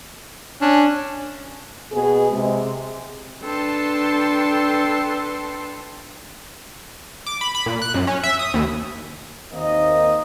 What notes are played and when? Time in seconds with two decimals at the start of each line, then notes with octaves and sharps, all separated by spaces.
0.61 C#4 D4
1.92 B2 B3 G#4
2.32 C3 G#3
3.42 D4 A4 B4 G5 A5 C6
7.26 D6
7.41 B5
7.55 B5
7.66 A#2
7.82 F#6
7.94 F#2
8.07 C#4
8.23 E5
8.39 D#6
8.54 D#2
9.52 D#2 A#3 C4 D#4 D#5